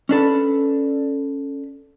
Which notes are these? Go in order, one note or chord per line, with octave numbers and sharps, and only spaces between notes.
C#4 D4 A4 B4